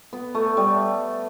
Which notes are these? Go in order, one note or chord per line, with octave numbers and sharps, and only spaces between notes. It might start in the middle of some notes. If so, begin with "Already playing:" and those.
B3
A3
G3